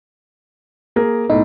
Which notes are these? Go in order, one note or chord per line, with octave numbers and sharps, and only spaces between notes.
A#3 G#4 A#4
B1 A2 D#4